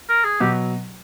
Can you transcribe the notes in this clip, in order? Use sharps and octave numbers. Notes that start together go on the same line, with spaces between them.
A#4
G#4
B2 F#3 G4